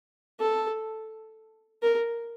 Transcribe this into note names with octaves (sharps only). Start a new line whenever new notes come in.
A4
A#4